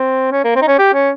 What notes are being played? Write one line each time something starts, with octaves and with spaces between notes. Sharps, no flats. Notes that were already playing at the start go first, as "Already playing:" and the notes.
Already playing: C4
C#4
A#3
C4
D#4
C#4
G4
C#4